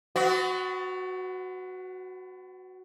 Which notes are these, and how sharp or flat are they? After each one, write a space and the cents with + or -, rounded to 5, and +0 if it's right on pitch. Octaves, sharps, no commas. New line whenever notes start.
B3 +40 F#4 +0